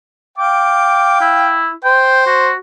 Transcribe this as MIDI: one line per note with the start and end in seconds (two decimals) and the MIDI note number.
0.38 1.58 77
0.38 1.58 79
0.38 1.19 86
1.21 1.71 64
1.84 2.49 72
1.84 2.22 79
2.27 2.55 66